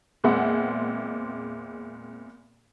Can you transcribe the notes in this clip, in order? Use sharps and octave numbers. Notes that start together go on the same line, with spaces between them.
E2 A#2 G#3 C4 E5 F#5